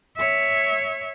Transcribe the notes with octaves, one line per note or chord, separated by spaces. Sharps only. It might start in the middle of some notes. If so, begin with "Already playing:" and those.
C#5 E5